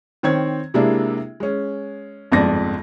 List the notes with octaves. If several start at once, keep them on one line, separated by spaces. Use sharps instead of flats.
D#3 C4 C#5 G#6
C3 G#3 A#3 D4 E4
G#3 C#4
G1 F2 G#2 D5 A#6